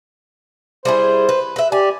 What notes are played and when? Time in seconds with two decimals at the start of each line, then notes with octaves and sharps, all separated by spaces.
0.85 G3 E4 G#4 C5
1.29 B4
1.56 B4 E5
1.72 G4 D5 G#5